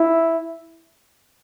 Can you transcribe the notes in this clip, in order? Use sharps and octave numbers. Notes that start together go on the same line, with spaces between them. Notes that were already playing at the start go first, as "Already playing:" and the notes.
Already playing: E4